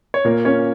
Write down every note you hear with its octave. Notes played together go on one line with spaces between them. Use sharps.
C#5
A#2 A#3 A#4
C#4 C#5